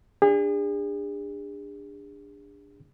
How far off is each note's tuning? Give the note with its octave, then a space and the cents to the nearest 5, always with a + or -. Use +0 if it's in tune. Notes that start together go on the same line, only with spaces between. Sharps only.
D4 +0 G#4 -40